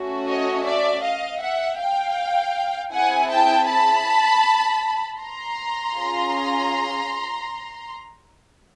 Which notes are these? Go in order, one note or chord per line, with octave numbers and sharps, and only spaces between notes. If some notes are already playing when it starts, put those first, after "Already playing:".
Already playing: A3 C#4 F#4
C#5 D#5
D5 E5
D#5 F5
E5 F#5
F5 G5
C4 E4 G#4 F#5 G#5
G5 A5
A5 B5
A#5 C6
C#4 F4 G#4